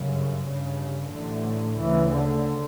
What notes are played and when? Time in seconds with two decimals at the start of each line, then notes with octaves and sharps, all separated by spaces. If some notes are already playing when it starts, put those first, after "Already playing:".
Already playing: G1 F#2 C#3
0.45 G1 G2 C#3
1.11 A1 A2 D3
1.78 D2 C#3 E3
2.12 D3